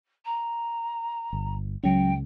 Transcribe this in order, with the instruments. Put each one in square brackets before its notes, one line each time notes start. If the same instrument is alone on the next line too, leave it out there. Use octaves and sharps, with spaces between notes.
[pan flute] A#5
[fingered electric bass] G1
[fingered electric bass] C#2 C#3 [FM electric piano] F#3 C#4 [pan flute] G5